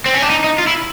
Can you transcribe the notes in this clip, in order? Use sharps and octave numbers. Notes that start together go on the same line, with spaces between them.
C4
C#4
D4
D#4
D#4
F4
E4